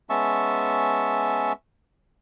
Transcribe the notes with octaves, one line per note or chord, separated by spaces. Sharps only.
G#3 B3 C#4 E5 A5 C#6